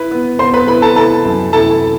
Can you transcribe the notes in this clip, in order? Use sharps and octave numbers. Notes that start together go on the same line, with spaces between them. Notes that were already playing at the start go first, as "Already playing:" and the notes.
Already playing: E4 B4 B5
B3
B3 C5 C6
B4 B5
E4 B4 B5
A4 A5
E4 A4 A5
F#2
E4 A4 A5